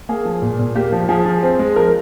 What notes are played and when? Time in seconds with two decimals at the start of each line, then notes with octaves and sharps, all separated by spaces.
0.09 A#3 G#4
0.25 F3
0.42 A#2
0.59 A#2
0.75 A#3 G4
0.92 F3
1.09 F3 G#4
1.26 F3
1.43 C4
1.59 G#3
1.76 F3 A#4